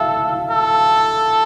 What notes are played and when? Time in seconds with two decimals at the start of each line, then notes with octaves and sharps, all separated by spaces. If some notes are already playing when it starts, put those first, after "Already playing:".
Already playing: A4 E5 F5
0.51 A4